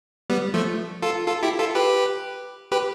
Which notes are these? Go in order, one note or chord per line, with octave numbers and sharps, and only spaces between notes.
G3 B3
F3 A3
F4 A4
F4 A4
E4 G4
F4 A4
G4 B4
G4 B4